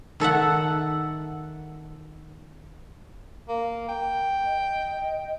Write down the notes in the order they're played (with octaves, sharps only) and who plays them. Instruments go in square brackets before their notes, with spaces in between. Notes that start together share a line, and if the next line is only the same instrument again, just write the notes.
[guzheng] D#3 A4 E5 F#5
[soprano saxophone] A#3
G5
[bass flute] D#5